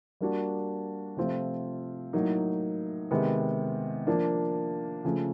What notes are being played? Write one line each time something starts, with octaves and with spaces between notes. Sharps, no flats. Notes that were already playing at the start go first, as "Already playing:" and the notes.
G3 A#3 D4 F#4
C3 F3 A3 C4 F4
A2 F#3 A#3 D#4
C3 D#3 G#3 B3
F3 A#3 D4
C#3 F3 A3